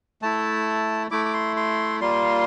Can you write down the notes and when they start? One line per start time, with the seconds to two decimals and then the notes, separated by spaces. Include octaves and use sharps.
0.22 A3 E4 A5
1.11 A3 E4 D6
1.25 D6
1.33 C6
1.56 C6
2.01 G3 A#3 F4 C6